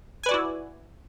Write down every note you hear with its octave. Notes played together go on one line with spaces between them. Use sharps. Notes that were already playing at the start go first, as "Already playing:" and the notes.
E4 F#4 B4 D5 G#5